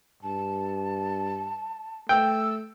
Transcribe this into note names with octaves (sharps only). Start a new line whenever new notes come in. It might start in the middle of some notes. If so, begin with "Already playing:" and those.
G2 A5
A3 G5 E6